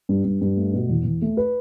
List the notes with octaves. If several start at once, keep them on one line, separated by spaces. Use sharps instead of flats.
G2
G2
G2
A3
B2
E2
E2
A3
B4